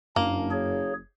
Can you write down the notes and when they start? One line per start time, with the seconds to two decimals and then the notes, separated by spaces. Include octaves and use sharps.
0.16 F#1 F#2 A#3 D4
0.51 G#4 C#5